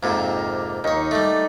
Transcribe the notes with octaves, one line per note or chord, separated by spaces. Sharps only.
F2 G#2 C3 A#3
D#2 D#4 C#5
G3 A3